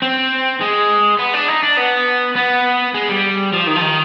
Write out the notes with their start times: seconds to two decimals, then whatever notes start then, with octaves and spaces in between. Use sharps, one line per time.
0.02 C4
0.61 G#3
1.19 B3
1.34 D4
1.48 D#4
1.63 D4
1.77 B3
2.36 B3
2.94 G#3
3.09 G3
3.53 F3
3.67 D#3
3.76 F3
3.82 D#3